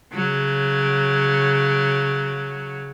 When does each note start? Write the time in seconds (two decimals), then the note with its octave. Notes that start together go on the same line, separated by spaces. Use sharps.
0.13 C#3 F#3